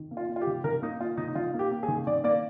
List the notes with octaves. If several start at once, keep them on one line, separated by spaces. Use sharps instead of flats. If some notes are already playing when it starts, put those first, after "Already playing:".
Already playing: D#3
A#3
F4
A#3
F4
G4
D#3
D#3 A#4
A#3 D#4
A#3 F4
D#3 D#4
D#4
D#3 F4
A#3
G4
A#3
G#4
D#3
D#3 D5
A#3 D5